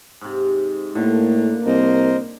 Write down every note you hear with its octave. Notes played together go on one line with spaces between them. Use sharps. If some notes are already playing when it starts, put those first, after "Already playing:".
G#2 C3
A2 D3 A#3
C2 A#4 C5 D#5